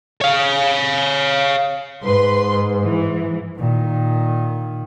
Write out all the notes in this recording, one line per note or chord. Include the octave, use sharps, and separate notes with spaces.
C#5 F5
G#2 B4 C6
E3
A#2 D#3